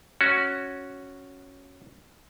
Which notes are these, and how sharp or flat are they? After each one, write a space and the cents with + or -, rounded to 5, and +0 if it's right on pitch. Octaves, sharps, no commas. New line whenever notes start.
C#4 +0 F#4 +0